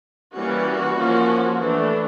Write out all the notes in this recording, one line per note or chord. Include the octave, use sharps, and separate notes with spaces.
E3 G3 A#3 C#4 F#4
F3 A#3 C#4
E3 A3 D4